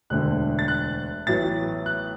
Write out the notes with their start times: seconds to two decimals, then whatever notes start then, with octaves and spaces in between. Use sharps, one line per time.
0.10 E1 D2 D3 F#6
0.59 A6
0.68 F#6
1.27 A1 A2 F#3 B3 A6
1.86 F#6